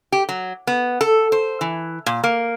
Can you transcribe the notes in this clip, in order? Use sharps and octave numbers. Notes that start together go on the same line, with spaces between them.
G4
F#3
B3
A4
C5
E3
A#2
A#3